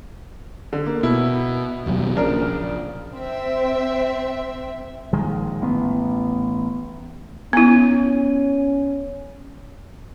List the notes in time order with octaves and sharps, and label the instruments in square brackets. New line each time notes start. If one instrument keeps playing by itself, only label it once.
[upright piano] D3
A#3
[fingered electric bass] B2 [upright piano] E4
[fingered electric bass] D#2 B2 F#3
[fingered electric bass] A#1 [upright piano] C#3 D4 A#4
[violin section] C4 E5
[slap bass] A#1 D#3 G#3
A1 B3
[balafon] B3 E4 [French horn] C#4